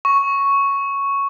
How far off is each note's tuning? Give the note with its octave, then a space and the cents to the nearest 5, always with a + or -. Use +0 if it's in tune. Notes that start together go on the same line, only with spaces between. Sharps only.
C#6 +0